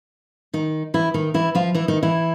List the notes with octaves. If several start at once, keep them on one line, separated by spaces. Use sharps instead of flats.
D#3 D#4
E3 E4
D#3 D#4
E3 E4
F3 F4
E3 E4
D#3 D#4
E3 E4